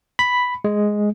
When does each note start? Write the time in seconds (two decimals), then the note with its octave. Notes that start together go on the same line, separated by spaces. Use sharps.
0.19 B5
0.64 G#3